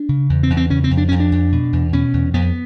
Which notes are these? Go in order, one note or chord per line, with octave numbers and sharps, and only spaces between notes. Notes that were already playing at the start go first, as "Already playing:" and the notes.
Already playing: D4
C#3
E2
C4
E2
C4
C#3 C#4
C4
F2
D4
F2 C#4
D4
F2
B2
E2
B2 C#4
E2
F2 B3